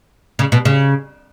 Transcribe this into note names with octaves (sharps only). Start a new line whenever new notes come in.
C#3
B2
C#3